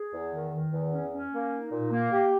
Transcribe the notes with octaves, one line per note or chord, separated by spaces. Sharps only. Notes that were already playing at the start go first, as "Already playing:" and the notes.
Already playing: G#4
E2
D#3
D#3
E2
C#4
C#4
A#3
D#4
A#2
A#3
G4